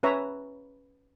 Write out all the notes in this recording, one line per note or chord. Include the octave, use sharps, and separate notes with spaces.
C#4 B4 C#5 E5 A#5